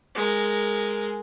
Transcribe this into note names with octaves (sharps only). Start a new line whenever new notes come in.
G#3 A#4